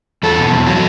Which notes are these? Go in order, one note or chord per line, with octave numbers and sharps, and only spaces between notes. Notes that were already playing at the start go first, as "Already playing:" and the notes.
E2 A4
B2
E2
F#3